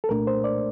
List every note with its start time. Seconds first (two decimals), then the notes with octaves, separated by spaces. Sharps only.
0.04 A4
0.09 C2 A#2 A3 D4 A#4
0.27 C5
0.44 D5